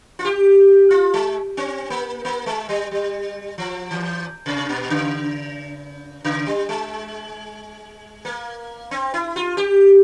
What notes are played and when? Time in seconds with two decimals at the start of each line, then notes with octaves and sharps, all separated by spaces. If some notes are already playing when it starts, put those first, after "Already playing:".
0.19 F4
0.25 G4
0.91 F4
1.14 G#3
1.57 C4
1.90 A#3
2.25 A#3
2.46 G#3
2.69 G3
2.91 G3
3.58 F3
3.91 E3
4.46 C3
4.69 A#2
4.90 C#3
6.24 C#3
6.47 G3
6.69 G#3
8.25 A#3
8.91 C4
9.14 E4
9.36 F4
9.57 G4